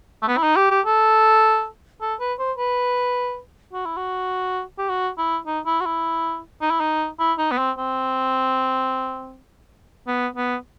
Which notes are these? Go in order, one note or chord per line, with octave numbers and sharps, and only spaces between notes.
A3
B3
E4
D#4
G4
G4
A4
A4
B4
C5
B4
F#4
E4
F#4
G4
F#4
E4
D#4
E4
F#4
E4
D#4
E4
D#4
E4
D#4
B3
C4
C4
B3
B3